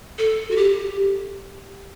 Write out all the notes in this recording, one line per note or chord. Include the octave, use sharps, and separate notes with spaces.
A4
F#4
G4